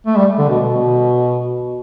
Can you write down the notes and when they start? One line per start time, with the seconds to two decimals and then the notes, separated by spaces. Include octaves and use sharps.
0.06 A3
0.17 G3
0.38 D3
0.49 B2
0.67 B2